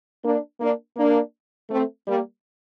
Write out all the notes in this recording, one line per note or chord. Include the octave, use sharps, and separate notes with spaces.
A#3 D4
A#3 D4
A#3 D4
A3 C4
G3 A#3